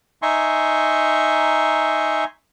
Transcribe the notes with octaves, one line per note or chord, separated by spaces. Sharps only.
D#4 E5 G#5 A#5 C6 C#6